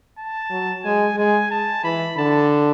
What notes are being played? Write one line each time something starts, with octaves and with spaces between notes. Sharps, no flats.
A5
F#3
G#3 G#5
G#3 G#5
A5
E3 B5
D3 A5